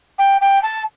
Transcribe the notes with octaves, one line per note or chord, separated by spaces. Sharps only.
G5
G5
A5